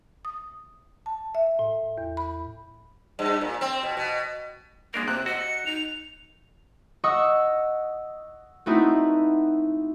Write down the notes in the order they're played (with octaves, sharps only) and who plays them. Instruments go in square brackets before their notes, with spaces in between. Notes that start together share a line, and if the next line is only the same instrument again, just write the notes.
[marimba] D#6
A5
E5
A2
E2
B5
[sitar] G2
A#2
C4
B2
B2
[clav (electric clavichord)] G#3 D4 A#4 [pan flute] A#3
[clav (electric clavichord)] C3 [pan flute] C5 [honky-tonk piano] F#6
[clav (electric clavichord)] F#4 [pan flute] D#5 [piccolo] E6
[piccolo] C#7
[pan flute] D#4 [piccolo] F7
[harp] D#5 F#5 C#6 D#6 E6
A3 B3 C4 D#4 E4 F#4